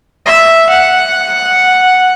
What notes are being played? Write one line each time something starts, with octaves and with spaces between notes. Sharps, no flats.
E5
F#5